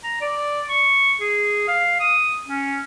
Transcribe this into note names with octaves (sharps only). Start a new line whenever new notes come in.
A#5
D5
C#6
G#4
F5
D#6
C#4